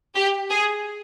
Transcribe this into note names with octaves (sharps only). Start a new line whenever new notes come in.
G4
G#4